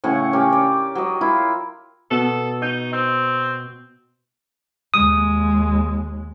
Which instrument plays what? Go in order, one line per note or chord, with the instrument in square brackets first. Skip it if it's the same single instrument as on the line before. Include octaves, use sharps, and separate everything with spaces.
[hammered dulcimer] A2 C#3 F#5 C#6
C#4 G4 A#4
D5
F#3 D#5
E4 F4 A#4
[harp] B2 E6 [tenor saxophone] A4
[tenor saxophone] D#4 [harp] G6
[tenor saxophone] C4
[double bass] D#2 G#3 [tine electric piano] D#6